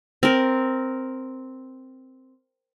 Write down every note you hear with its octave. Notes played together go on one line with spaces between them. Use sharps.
C4 A#4